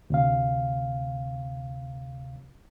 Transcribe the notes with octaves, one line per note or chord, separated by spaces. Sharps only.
D2 C3 F5